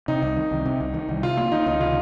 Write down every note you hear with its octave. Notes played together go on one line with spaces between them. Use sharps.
C3 D#4
C2
D#3
C2
C3
C2
D#3
C2
C3 F4
A#3 F4
D#3 D#4
C#2 D#4
C3 F4